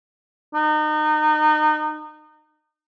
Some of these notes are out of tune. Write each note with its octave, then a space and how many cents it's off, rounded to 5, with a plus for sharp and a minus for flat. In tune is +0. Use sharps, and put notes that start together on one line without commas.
D#4 -30